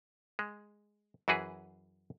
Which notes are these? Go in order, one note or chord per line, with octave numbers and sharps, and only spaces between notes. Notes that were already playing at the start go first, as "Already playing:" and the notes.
G#3
F#2 E3 F#4 G#4 B4